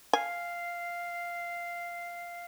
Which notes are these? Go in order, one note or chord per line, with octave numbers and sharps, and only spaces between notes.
F5 G#5